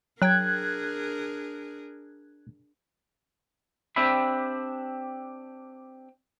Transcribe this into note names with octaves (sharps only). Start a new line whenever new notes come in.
F#3 D4 G#4 A#4 G5 F#6 G#6
C4 D4 G4 E5 B5